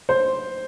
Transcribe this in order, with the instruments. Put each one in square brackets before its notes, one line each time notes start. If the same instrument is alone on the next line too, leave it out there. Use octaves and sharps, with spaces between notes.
[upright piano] C5